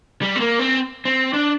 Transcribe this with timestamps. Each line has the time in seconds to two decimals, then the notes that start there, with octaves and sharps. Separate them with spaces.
0.22 G3
0.36 C4
0.40 A#3
0.59 C4
1.05 C4
1.33 D4